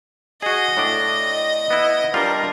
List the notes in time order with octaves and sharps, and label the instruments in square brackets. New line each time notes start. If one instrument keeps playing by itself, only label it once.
[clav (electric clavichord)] F#4 G#4 [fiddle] D#5
[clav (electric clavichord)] A2 D4 D5
B3 E4
[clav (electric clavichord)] G3 F4 A#5 [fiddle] D4 A#4